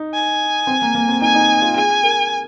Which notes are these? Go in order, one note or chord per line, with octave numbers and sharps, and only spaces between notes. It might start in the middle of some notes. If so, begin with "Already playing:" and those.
Already playing: D#4
G#5
C4
A#3
A#3
C4
D#4 G#5
D#4
F4
G#4 G#5
A#4